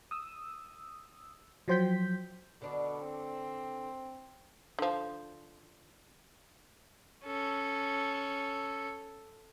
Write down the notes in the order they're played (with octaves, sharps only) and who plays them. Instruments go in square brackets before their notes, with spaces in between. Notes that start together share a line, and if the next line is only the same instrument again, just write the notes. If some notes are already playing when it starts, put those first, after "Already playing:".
[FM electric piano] D#6 E6
F3 F#3 C5 G5 G6 B6
[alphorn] B2 [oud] D3 D4
[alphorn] C4
[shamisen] D3 F3
[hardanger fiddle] C#4 A4